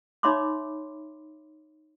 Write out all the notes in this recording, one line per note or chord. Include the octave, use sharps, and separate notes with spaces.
D#4 C#5 E5 B5 C6 D6